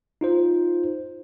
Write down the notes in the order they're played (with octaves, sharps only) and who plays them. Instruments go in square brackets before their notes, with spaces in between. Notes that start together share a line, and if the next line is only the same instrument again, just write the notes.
[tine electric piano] D#4 F4 C5